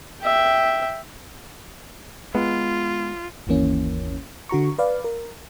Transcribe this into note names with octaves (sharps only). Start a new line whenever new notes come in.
E5 G5
G#3 B3 F4
G1 D#2 E3 A#3 C#4
D3 F#4 A#5 C#6
B4 D5 F5
A#4